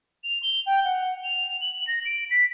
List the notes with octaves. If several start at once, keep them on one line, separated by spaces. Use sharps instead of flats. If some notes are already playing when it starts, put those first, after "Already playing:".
F7
G7
G5
F#5
F7
F#7
A#6
D7
B6